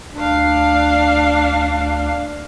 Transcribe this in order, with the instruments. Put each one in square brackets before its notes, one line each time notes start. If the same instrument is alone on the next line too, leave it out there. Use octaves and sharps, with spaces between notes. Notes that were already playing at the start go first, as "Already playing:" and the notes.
[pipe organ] D2 [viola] D4 F5